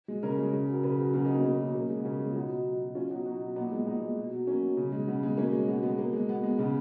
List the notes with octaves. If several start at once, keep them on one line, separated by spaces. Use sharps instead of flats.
G#3
C#3 A#4 C#5
G#3
C#3
F#3
A#4
C#3 G#4 B4
F#3
C#3 F#4 A#4
B3 D#4
F#3
A#3 C#4
C#3 A#3
F#3
C#3 A#3
G#3
B3
C#3 A#3 C#4
G#3
F4
B2 B3 D#4
F#3
B2
F#3
B2 C#4 F4
F#3 D#4 F#4
B2 D#4 F#4
F#3
A#2 B3 D#4
G#3
A#2 B3 D#4
G#3
B2
F#3
B2 A#3 C#4
F#3
C#3
G#3
C#3 B3
G#3
B2 A#3 C#4
G#3
B2 B3
G#3 B3
B2 A#3
G#3
B2 B3
G#3
C#3 B3